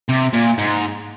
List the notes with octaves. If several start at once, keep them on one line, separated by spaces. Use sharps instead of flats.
C3
A#2
G#2